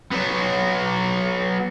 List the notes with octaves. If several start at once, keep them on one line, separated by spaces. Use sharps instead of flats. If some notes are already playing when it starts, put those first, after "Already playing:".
F#3 B3